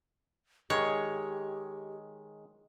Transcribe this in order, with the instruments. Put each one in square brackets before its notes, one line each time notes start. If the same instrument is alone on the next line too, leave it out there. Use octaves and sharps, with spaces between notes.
[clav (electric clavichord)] D#3 G#3 [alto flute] G4 [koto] C#5